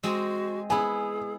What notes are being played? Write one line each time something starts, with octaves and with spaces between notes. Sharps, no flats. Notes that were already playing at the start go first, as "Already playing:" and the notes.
G#3 C4 F#4
B3 E4 G#4 G#5 B5